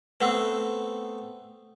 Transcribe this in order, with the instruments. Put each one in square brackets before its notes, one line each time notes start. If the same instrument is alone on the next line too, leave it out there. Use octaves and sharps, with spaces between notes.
[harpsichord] A3 B3 C4 [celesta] B4 F#5 E6